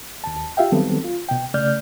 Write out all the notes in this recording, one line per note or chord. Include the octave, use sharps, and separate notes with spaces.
D#2 A5
F4 G4 E5 F5 G5
D#3 F#3 G3 B3 C4 A4
F4
B2 G5
C#3 A3 D5 F6 G6